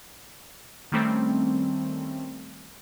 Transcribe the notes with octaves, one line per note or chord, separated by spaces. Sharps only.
D#3 G3 A3 C4 C#4